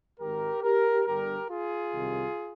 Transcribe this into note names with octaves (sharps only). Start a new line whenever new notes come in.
G#1 G#2 D#3 G4 A#4
G4 A#4
G1 G2 D3 G4 A#4
F4 G#4
C2 C3 D#3